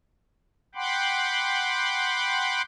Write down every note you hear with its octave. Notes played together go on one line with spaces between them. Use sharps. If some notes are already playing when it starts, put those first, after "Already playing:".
F#5 G5 B5 C6 D6